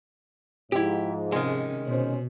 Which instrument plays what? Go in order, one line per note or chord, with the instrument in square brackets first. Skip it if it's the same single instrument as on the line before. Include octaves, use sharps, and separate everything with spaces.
[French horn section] G#2 F3 [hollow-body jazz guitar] E4 G4
[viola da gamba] C3 C#4 [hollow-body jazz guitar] D#3 G#3
[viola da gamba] B2 [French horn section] C#4 C5